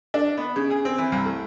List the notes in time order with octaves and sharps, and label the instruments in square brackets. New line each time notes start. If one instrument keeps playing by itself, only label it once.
[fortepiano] D4
B3
C#3
G#4
C4
E3
C2
A3